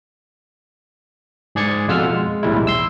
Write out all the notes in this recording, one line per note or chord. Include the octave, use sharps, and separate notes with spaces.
G#2 G#4 D5 G#6 C#7
F2 B2 F4 F#5 E6 F6
G#3
B1 E2 A2 G3 G#3 E4
C6 E6